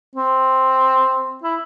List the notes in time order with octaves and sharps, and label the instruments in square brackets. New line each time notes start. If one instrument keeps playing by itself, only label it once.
[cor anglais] C4
E4